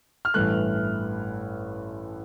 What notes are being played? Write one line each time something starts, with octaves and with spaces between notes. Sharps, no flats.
F6
A1 G2 E3 A3 F#6